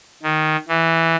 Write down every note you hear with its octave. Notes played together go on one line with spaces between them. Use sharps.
D#3
E3